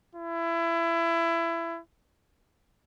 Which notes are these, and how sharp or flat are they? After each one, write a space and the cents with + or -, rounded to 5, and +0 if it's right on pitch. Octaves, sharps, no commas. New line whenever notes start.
E4 +25